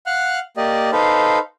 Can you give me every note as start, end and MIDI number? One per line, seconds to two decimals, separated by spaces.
0.06 0.39 77
0.06 0.39 78
0.06 0.39 89
0.06 0.39 90
0.57 0.90 58
0.57 0.90 67
0.57 0.90 74
0.57 0.90 75
0.92 1.38 63
0.92 1.38 69
0.92 1.38 71
0.92 1.38 72
0.92 1.38 77